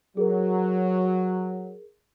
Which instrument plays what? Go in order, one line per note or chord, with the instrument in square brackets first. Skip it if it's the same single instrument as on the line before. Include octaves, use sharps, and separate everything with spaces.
[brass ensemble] F#3 [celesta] G#4 A#4